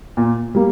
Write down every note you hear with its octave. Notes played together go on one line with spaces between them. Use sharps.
A#2
G3 A#3